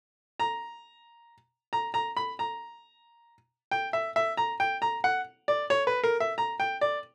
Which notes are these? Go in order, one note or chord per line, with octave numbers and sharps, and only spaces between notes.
A#5
A#5
A#5
B5
A#5
G5
E5
E5
A#5
G5
A#5
F#5
D5
C#5
B4
A#4
E5
A#5
G5
D5